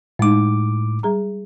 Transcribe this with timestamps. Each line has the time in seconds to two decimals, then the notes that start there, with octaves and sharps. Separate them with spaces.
0.19 A2 G#3 D#4 D6
1.03 G3 G#4 A#5